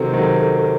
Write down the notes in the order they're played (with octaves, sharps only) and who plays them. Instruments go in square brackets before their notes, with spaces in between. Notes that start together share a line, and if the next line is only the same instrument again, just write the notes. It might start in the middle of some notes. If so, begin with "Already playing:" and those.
Already playing: [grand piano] C3 D#3 F#3 C4 [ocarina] A4
[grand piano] C3 D#3 F#3 C4